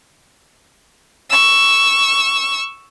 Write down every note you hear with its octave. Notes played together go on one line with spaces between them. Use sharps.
C#6 E6